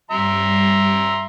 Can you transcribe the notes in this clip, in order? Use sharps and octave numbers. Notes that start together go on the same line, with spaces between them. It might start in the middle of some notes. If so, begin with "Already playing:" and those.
G2 G3 E5 A#5 C6